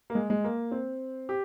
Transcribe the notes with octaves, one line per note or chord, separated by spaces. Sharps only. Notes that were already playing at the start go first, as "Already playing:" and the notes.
A#3
G#3
G#3
A#3
C4
G4